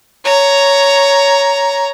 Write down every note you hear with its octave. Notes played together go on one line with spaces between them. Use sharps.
C#5 A#5